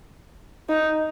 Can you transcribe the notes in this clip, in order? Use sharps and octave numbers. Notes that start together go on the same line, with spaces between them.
D#4